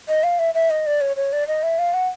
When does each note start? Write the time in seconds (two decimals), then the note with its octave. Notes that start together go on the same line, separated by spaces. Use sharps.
0.08 D#5
0.23 F5
0.39 E5
0.54 E5
0.70 D#5
0.86 D5
1.01 C#5
1.16 C#5
1.33 D5
1.48 D#5
1.63 E5
1.79 F5
1.94 F#5